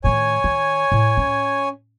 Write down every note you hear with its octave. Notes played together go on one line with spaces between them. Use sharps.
A2 D#3 C#5 G#5
D#3
A2
C#4